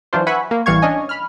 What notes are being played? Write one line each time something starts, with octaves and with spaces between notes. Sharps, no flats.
E3 F#3 D4 F4 C5
B4 E5 F#5 G#5 B5 C#6
A#3
A1 E3 G3 F5 C#6 G#6
C#4 D4 C#5 D#5 G#5
B5 F6